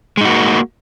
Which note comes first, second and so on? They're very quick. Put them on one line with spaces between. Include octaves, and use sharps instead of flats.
G#3 D#4 F#4 A#3